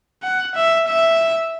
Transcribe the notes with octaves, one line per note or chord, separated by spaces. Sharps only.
F#5
E5
E5